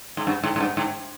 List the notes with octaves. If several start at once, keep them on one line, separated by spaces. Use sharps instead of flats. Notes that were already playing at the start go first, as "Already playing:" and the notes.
G#2
G2
G#2
G#2
G2
G#2